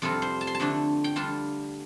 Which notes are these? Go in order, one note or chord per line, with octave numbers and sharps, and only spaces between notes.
F2 C3 G3 F4 A4
C5
A5
C6
A5
F2 D3 A3 D4
G5
D3 G3 D4 F4 A5